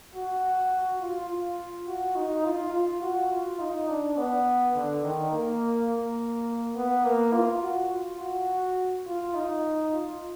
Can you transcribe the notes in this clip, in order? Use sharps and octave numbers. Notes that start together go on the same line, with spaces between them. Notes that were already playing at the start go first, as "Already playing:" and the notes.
F#4
F4
F4
F#4
D#4
F4
F4
F#4
F4
D#4
D4
B3
D3
D#3
A#3
A#3
B3
A#3
F4
F#4
F4
F#4
F4
D#4
F4